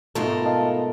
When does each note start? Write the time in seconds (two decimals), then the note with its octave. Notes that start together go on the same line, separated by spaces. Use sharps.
0.15 G#2 B2 A3 B3 F4 A4 A#4
0.45 D#5 F5 A5